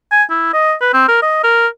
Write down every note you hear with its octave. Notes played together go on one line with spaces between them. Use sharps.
G#5
E4
D#5
B4
C4
A#4
D#5
A#4